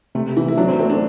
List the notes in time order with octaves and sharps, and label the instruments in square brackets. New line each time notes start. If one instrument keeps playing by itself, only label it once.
[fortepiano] C3 [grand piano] A3
[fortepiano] E3 [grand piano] E4
[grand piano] E4
[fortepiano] F#3 [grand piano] D4
[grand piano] C4
[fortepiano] A3 [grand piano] C4
[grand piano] D4